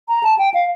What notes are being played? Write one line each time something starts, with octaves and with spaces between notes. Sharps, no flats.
A#5
A5
G5
F5